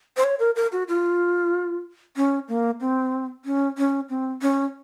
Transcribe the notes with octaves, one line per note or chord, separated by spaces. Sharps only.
C5
C#5
A#4
A#4
F#4
F4
C#4
A#3
C4
C#4
C#4
C4
C#4